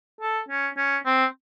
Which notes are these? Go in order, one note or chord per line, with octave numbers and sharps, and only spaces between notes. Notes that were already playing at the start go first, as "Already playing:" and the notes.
A4
C#4
C#4
C4